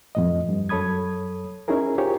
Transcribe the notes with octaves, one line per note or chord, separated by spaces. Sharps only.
F2 A2 D#5
G2
F#2 A4 C#5 B5 D#6 G#6
C#4 D#4 E4 G#4 A#4
F4 G4 G#4 A#4 C5 C#5